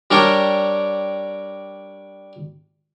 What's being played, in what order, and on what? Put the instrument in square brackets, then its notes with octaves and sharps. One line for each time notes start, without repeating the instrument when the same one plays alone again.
[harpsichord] G3 D4 A#4 C#5 G5